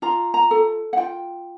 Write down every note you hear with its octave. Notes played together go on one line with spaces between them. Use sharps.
F4 A#5
A#5
A4
F#5
F4 G5